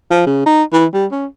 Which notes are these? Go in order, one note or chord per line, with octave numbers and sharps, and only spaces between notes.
F3
C#3
D#4
E3
G3
C#4